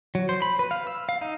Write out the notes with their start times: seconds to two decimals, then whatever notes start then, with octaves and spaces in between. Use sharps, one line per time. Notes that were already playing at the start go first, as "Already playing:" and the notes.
0.15 F#3
0.29 C5
0.42 B5
0.59 B4
0.71 F5
0.87 E6
1.09 F5
1.21 D#4